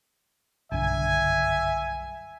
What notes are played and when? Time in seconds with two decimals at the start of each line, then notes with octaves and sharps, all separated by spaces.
0.72 F#1 B1 G2 D3 E5 G#5